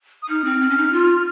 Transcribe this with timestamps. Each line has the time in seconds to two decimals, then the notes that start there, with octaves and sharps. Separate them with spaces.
0.22 D#6
0.29 D#4 F6
0.45 C4
0.61 C4
0.70 C#4
0.77 D#4
0.92 F4